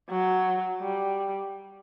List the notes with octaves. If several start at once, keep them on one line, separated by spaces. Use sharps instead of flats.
F#3
G3